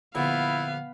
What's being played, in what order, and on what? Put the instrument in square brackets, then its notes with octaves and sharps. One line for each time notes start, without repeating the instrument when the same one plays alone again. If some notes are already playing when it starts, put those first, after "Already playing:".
[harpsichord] A#1 D3 [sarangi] B3 [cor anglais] E4 [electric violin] F5